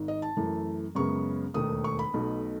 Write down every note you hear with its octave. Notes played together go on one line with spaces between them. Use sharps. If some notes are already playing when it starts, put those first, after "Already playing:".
Already playing: G#1 G#2
D#5
A5
F#2 E3 A3
F#2 C#3 G#3 B3 C#6
E1 D#2 D#3 A3 D#6
C#6
B5
B1 B2 A3